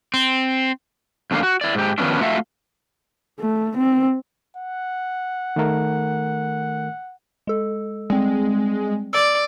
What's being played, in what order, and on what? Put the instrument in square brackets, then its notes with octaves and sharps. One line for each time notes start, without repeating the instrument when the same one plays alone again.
[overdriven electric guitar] C4
[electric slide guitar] F2 D#3 A3 A#3 D4 F5
F#4
E4 D5
G#2 G4
D#3 F3 B3 C#4 D4
A3 F4 F#4 A4 E5 F5
[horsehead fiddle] A3
C4
[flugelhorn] F#5
[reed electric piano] D#3 A3 A#4
[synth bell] G#3 A4
[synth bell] G3 C4 [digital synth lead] G#3
[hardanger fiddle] D5 [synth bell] E6